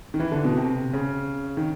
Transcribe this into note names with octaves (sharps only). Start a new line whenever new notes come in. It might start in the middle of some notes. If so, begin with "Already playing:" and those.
D#3
E3
D3
B2
C3
C#3
D#3